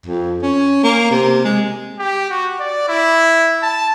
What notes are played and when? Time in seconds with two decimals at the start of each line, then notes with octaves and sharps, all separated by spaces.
0.06 F2
0.42 C#4
0.84 A#3
1.11 C3
1.45 G#3
1.99 G4
2.30 F#4
2.60 D5
2.89 E4
3.63 A5